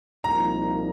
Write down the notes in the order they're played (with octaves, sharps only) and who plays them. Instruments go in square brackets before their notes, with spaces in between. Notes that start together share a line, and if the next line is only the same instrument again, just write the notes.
[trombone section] C2 A#2 F3 A#3 D#4 [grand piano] A#5